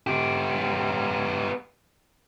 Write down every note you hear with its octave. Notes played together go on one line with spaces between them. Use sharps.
B3 G4